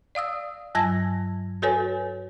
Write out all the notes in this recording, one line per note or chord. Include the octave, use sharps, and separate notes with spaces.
D5 F5 D#6 E6
G2 F#3 A5 E6 G#6 A#6
F#4 A4 B4 C#5 G#5